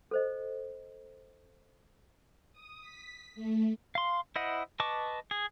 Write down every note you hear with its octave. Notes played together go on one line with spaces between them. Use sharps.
A4 C5 D#5
D#6
B6
A3
F5 C6
E4 C5 D#5 F#5
B4 D#5 A5 C#6 D6
G#4